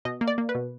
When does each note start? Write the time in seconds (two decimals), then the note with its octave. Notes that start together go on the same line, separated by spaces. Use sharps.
0.05 B2 D#5
0.21 A#3
0.28 D5
0.38 A#3
0.49 B4
0.55 B2